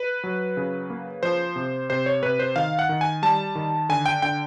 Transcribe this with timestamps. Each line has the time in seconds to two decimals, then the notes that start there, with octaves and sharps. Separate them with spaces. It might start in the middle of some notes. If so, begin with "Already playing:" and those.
Already playing: B4
0.24 F#3
0.57 C#3
0.90 A#3
1.23 F3 C5
1.56 C3
1.90 C3 C5
2.06 C#5
2.23 C3 B4
2.40 C5
2.56 D#3 F5
2.79 F#5
2.89 D#3
3.01 G#5
3.23 G3 A5
3.55 D#3
3.89 D3 G#5
4.06 G5
4.22 D3 G5